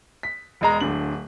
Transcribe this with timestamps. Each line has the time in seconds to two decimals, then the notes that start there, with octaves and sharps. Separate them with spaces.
0.23 B6
0.61 E1 G#3 A#5
0.80 D1 D3 F#7